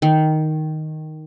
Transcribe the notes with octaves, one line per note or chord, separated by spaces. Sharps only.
D#3